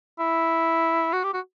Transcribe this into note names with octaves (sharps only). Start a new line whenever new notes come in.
E4
F#4
G4
F#4